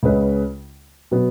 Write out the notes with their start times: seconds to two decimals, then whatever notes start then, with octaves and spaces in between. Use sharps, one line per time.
0.03 C#2 C#3 G#3 C#4 B4
1.11 B2 F#3 B3